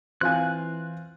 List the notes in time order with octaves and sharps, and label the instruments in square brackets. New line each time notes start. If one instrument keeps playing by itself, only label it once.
[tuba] E3 [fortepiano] C4 F4 G#5 [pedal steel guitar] F#6